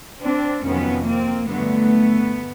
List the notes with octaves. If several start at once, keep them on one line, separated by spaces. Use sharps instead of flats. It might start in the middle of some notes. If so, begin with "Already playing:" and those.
C4 D4
F2 C3 D#3 F#3 B3 C#4
A#3 C4
G2 D3 F#3 A3 B3